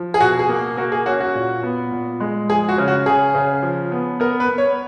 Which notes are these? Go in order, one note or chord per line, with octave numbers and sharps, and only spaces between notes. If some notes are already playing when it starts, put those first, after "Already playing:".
Already playing: F3
G#4
B2 F#4
G#4
A#3
A#3 F#4
G#4
C#4 F#4
F#4
A#2
B3
A#2
G#3
F3 G#4
F#4
C#3
F#4
C#3 G#4
C#3
F3
B3
B3 A#4
B4
B3
C#5